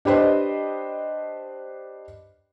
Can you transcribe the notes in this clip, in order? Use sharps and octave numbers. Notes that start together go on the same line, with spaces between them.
D4 G4 B4 C5 D#5